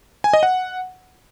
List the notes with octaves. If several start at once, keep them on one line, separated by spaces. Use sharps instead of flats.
G#5
D#5
F#5